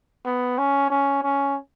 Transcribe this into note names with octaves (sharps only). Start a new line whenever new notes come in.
B3
C#4
C#4
C#4